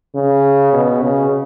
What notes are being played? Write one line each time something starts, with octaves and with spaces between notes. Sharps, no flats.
C#3
B2
C#3